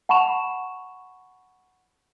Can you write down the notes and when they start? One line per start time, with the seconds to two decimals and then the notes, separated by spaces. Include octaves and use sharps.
0.09 F#5 A5 B5 C#6 E7 F7